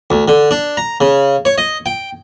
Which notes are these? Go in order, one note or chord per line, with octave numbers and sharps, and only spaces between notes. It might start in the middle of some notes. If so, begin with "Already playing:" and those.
D2
D3
D4
A#5
C#3
C#5
D#5
G5